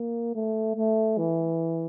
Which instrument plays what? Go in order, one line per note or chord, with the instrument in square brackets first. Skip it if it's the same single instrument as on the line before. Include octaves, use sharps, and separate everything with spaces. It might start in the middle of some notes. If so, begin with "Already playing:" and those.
Already playing: [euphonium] A#3
A3
A3
E3